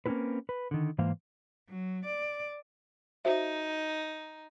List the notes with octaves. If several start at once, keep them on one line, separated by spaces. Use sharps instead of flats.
A#3 C4 C#4 E4 F#4 B4
B4
D3 D#3
G#2 E3 A#3 C5 F5
F#3
D5
D#4 F#4 C5 E5